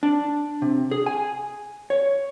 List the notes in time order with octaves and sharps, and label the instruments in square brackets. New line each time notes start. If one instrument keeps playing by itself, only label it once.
[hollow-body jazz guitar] D4
C3
G#4
G#5
C#5